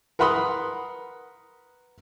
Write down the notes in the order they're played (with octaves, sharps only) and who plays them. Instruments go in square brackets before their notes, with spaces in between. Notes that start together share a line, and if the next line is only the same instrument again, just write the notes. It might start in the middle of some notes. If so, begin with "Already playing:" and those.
[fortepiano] A#4 B4 F#5 B5 C6 D#6